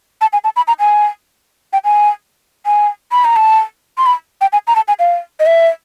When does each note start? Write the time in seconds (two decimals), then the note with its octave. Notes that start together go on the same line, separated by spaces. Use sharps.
0.21 A5
0.33 G#5
0.44 A5
0.56 B5
0.68 A#5
0.80 G#5
1.73 G5
1.84 G#5
2.66 G#5
3.12 B5
3.25 A#5
3.36 A5
3.98 C6
4.06 B5
4.41 G5
4.53 G#5
4.67 A#5
4.76 A5
4.88 G#5
4.99 F5
5.40 D#5
5.46 E5